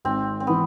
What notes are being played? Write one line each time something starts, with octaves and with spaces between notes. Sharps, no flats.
G#1 C4
C4
E3 B3